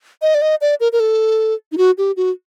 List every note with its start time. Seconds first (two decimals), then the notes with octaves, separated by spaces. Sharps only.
0.22 D#5
0.35 D5
0.42 D#5
0.61 D5
0.80 A#4
0.92 A#4
1.00 A4
1.72 D#4
1.78 F#4
1.98 G4
2.17 F#4